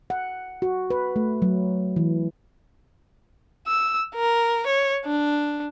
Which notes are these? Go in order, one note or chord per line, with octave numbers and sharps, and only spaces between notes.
F#5
F#4
B4
A3
F#3
E3
E6
A#4
C#5
D4